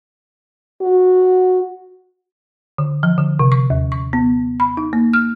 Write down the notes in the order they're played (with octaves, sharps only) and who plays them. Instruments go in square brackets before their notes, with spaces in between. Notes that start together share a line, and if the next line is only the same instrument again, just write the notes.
[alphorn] F#4
[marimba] D3
F3
D3
C3
C#6
D#2
C#6
B3
B5
D#4
A#3
F6